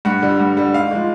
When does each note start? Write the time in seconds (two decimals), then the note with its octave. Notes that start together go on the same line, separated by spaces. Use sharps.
0.05 G2 F#5
0.22 D3 G3
0.40 G2
0.57 D3 G3
0.74 G#2 F5
0.91 F3 G#3